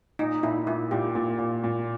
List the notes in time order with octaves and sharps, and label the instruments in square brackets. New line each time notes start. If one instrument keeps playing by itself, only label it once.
[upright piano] A#2 [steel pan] D#4
[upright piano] A#2 [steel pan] E4
[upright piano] A#2 [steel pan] E4
[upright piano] A#2 [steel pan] G4
[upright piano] A#2
A#2
A#2